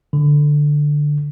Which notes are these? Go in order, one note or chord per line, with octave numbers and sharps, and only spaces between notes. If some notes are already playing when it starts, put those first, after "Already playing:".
D3